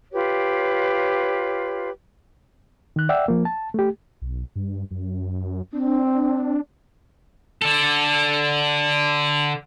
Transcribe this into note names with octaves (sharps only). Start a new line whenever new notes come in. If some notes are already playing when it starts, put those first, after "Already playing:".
F4 G4 B4 C#5
D#3 F#6
D5 E5 F#5 G5 E6
F3 A#3
A5
A3 G4
B1
G2
F#2
C4 D4
D3 A4